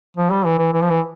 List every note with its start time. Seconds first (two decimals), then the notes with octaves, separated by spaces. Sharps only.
0.17 F3
0.30 G3
0.45 E3
0.59 E3
0.73 E3
0.82 F3
0.90 E3